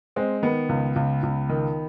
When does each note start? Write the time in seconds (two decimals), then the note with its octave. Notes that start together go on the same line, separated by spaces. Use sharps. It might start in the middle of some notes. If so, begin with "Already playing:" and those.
0.16 G#3 C4
0.43 D#3 B3
0.69 C#2
0.96 C#2
1.23 C#2
1.49 D#3